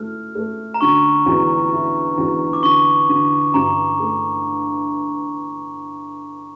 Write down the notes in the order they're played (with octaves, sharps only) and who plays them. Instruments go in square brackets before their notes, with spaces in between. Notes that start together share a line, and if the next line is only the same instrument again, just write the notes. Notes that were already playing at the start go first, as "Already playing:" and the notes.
Already playing: [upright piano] A3 E4 [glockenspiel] F6
[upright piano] A3
[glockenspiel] A#5
[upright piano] D3 [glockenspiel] C#6
[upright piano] E2
E4
E2
[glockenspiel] D6
[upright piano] D3 [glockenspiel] C#6
[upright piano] D3
[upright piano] G2 [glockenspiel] A#5
[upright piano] A3